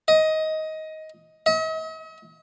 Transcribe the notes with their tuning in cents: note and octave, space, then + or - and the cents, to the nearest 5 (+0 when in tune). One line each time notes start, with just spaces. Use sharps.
D#5 +15
D#5 +45